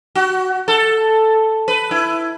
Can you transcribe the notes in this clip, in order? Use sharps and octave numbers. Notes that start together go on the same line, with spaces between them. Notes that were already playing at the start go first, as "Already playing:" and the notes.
F#4
A4
B4
E4